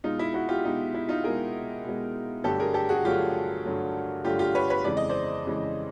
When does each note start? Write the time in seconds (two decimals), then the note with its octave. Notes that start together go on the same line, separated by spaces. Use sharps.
0.04 B2 G#3 D#4 F4
0.19 E4
0.34 E4 F#4
0.49 F4 G4
0.64 B2 G#3 D#4
0.94 E4
1.09 D#4 F4
1.24 B2 G#3 G#4 A#4
1.84 B2 G#3
2.44 G2 D3 F#3 A3 G4 A4
2.60 G#4 A#4
2.74 G4 A4
2.89 F#4 G#4
3.04 G2 D3 F#3 A3 F4 G4
3.64 G2 D3 F#3 A3
4.24 G2 D3 F#3 A3 F4 G4
4.39 F4 G4
4.55 B4 C#5
4.70 B4 C#5
4.84 F2 C#3 E3 G#3 D5
4.97 D#5
5.09 C5 D5
5.45 F2 C#3 E3 G#3